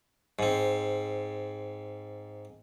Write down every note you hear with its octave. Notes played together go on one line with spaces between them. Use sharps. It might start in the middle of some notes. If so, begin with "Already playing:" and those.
G#2 C4